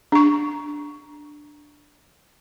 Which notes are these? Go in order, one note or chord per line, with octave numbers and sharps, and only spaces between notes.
D4 C#6